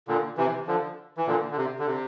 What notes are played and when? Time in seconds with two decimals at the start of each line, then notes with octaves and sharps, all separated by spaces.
0.08 A#2 D3
0.37 C3 E3
0.67 D3 F3
1.17 E3
1.27 A#2 D3
1.51 D3
1.57 C3
1.79 D3
1.87 C3